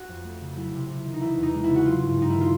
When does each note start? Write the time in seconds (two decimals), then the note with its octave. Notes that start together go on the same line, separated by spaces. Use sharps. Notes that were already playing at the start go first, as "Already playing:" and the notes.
Already playing: F#4
0.09 F2
0.24 A3
0.40 C#3
0.56 F#3 E4
0.73 C3
0.89 C3
1.04 D#3
1.14 D#4
1.20 E3 E4
1.37 E2
1.43 D#4
1.54 G#3
1.64 E4
1.69 C#3
1.76 F#4
1.86 F#3 F4
2.02 G2
2.17 G2 D#4
2.30 D#3 E4
2.41 F4